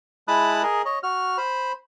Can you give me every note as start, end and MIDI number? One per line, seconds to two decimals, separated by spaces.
0.28 0.63 56
0.28 0.63 64
0.28 0.63 81
0.28 0.63 83
0.28 0.63 87
0.28 0.63 90
0.63 0.82 68
0.63 0.82 70
0.63 0.82 75
0.85 0.99 73
0.85 0.99 75
1.03 1.38 66
1.03 1.38 89
1.38 1.72 72
1.38 1.72 83